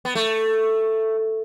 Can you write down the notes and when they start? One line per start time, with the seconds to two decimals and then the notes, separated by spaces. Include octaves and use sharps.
0.05 B3
0.15 A3